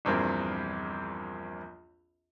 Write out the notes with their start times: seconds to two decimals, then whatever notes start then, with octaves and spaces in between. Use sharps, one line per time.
0.05 A#1 E2 G2 C4 A#4